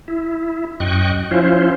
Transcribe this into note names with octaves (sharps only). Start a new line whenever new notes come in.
E4
F#2 D#5 G5 C#6 F#6
F3 C#4 E4 F4 C5